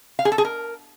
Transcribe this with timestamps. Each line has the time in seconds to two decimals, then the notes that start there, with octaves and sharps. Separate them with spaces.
0.19 F5
0.25 G#4
0.32 A4
0.38 G#4
0.45 A#4